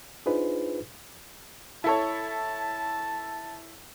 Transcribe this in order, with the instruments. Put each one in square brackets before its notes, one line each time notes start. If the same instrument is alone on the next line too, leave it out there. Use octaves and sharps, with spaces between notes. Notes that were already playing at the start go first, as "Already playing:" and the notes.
[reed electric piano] D4 D#4 F4 G#4 B4 C5
[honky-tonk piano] E4 A4 C#5 [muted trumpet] A5